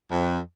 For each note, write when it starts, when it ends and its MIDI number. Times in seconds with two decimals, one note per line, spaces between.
0.10 0.38 41